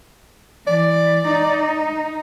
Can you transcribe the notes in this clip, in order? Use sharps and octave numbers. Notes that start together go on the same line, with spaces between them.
E3 D5
D#4